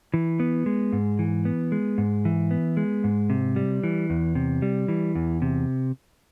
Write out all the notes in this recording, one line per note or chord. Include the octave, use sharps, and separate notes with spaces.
E3
B3
G#3
G#2
E3
B3
G#3
G#2
E3
B3
G#3
G#2
C3
G3
E3
E2
C3
G3
E3
E2
C3